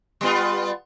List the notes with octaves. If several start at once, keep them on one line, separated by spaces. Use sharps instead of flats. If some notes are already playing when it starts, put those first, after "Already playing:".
G3 B3 F4